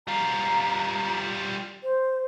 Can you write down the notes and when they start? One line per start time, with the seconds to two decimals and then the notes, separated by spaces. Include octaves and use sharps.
0.07 G3 F4 A#5
1.83 C5